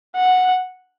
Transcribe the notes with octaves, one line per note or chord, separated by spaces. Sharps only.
F#5